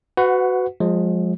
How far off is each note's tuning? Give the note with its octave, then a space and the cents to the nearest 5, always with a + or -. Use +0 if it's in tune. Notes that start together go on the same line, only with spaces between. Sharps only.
F#4 +5 B4 +25 F#5 -15
F3 +30 G#3 +0